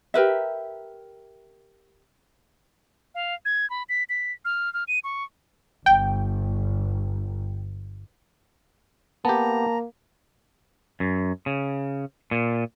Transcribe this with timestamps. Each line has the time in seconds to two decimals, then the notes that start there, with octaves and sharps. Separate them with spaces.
0.14 G4 A#4 B4 E5
3.15 F5
3.45 G#6
3.70 B5
3.89 B6
4.09 B6
4.45 F6
4.74 F6
4.88 D#7
5.04 C#6
5.86 G1 G5
9.25 A#3 B3 G4 A5 A#5
11.00 F#2
11.46 C#3
12.31 A#2